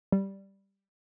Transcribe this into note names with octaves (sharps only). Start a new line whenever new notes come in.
G3